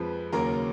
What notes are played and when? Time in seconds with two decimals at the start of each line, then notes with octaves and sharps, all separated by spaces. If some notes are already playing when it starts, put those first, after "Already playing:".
Already playing: F2 F3 G#3 B4
0.33 D#2 C#3 F#3 A#3 A#4 A#5